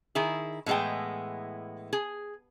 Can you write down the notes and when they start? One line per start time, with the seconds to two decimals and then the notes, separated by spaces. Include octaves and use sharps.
0.15 D#3 E4 G#4
0.66 A2 E3 G#3 B3 G5
1.93 G#4